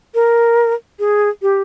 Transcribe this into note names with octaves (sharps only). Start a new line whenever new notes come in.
A#4
G#4
G4